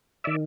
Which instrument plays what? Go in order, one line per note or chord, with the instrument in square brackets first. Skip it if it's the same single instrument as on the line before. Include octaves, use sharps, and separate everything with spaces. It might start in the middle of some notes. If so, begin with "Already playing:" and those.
[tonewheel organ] D#3 D5 E5